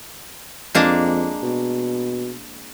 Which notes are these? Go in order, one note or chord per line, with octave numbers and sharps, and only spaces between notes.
F2 G#3 A#3 D4
B2